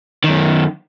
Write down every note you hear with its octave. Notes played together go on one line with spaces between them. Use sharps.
F#2 D#3